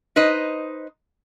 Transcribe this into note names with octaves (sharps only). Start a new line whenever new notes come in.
D#4 B4 C5 D#5